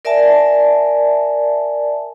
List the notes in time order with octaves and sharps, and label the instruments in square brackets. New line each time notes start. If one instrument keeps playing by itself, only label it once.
[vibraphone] A#4 D5 E5 G#5 A5